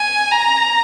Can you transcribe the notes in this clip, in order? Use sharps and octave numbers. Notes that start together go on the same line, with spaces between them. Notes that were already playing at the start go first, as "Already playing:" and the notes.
Already playing: G#5
A#5